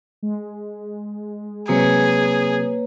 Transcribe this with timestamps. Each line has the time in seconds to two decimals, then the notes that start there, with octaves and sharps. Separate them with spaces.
0.23 G#3
1.69 C3 F#3 A#3 C4 G#4 B4 C#5